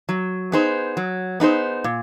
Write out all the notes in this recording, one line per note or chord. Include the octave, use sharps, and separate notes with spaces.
F#3
B3 D#4 G#4 C5
F#3
B3 D#4 G#4 C5
A#2